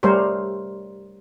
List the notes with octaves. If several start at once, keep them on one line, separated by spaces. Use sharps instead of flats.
G3 A3 A#4 C5 C#5